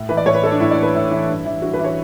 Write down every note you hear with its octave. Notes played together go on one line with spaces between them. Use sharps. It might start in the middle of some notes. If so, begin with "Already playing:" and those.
Already playing: A2
E3 B4
D5
A2 C#5
B4
E3 A4
D4
A2 E4
D5
E3
B4
A2 E4
E3
G2
E3
G2 F#4
B4
E3
C#5